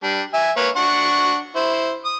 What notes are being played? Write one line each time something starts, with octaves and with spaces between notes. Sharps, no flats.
G3 D4
E5 G#5
A#3 B4 C#5
D4 F#5 C#6
E4 C5
D#6